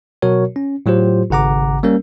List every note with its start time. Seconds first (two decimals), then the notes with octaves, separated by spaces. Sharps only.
0.22 B2 F#3 F#4 A#4 C#5
0.56 C#4
0.86 A2 F#3 F4 G4 C5
1.30 G#1 C#3 F#5 A#5 D6
1.83 G3 A#3 C#4 A#4